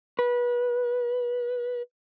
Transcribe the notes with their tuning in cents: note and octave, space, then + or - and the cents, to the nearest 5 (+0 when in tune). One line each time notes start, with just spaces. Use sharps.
B4 -25